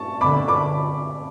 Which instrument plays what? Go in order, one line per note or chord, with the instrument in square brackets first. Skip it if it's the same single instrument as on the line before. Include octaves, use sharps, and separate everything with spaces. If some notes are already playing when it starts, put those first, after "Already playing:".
Already playing: [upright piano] A5 C#6
[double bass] D3 [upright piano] B5 D6
[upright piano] B5 D6